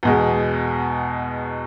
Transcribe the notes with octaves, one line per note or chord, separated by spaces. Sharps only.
E2 B2 G#3